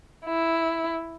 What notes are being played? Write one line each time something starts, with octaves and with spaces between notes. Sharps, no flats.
E4